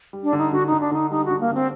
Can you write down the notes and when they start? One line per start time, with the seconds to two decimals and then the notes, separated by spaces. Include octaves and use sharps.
0.13 G3
0.23 D4
0.33 D3
0.38 D#4
0.52 D3 F#4
0.66 D#4
0.72 D3
0.80 D4
0.91 D3 D#4
1.10 G3 D#4
1.25 D3 F#4
1.40 A#3
1.50 D3 C4